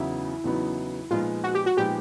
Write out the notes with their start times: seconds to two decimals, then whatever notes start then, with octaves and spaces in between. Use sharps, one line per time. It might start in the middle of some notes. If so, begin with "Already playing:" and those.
Already playing: E2 C#3 F#3 B3 D#4 E4
0.44 E2 C#3 F#3 B3 D#4
1.10 A#2 F3 G#3 B3 D#4 F4
1.44 F#4
1.55 G4
1.66 F#4
1.77 A#2 F3 G#3 B3 D#4 G4